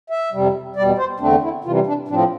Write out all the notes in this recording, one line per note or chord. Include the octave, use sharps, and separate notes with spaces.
E5
F2 C3 G3
E2 B2 G3 D5
C5
E2 D3 A3 C4 D4
E4
C3 E3 G3 F4
D4
A2 F3 C4 D4